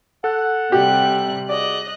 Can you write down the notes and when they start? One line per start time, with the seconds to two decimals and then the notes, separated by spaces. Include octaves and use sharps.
0.24 A4 F#5
0.72 C3 G3 G4 F#6
1.48 F#4 G#4 D5 D#5 F#6